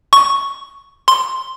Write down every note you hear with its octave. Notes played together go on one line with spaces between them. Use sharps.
C#6
C6